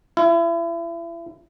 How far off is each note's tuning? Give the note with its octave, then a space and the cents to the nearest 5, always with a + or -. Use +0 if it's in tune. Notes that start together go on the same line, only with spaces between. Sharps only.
E4 +35